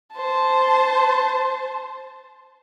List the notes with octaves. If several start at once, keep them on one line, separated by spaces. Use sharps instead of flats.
C5 A5